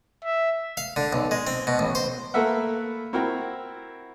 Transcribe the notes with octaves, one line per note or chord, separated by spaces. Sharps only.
E5
F5
D3
B1
G#3
C4
B2
A1
C5
A3 A#3 A4 B4 E5 F#5
C4 E4 F#4 A#4 G5